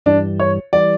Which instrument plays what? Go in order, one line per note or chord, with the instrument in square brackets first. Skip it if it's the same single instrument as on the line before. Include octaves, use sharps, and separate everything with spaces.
[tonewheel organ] G2 E3 G3 [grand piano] D4
[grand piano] C#5
[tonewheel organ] E3 G3 [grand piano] D5